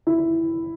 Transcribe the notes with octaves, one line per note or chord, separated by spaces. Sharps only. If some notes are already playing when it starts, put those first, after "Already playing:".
E4